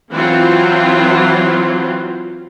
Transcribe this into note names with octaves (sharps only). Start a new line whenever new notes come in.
E3 F#3 C4 F4